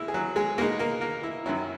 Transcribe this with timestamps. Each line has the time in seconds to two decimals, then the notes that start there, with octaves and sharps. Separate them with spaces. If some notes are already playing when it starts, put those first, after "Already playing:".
Already playing: D#2 E3 G#3 E4
0.08 G#4
0.14 F#3 F#4
0.36 G#3 G#4
0.58 B2 G#3 A#3 D#4 A#4
0.79 A#3 A#4
1.01 A#3 A#4
1.23 E4
1.46 F#2 D#3 F#3 C#4 E4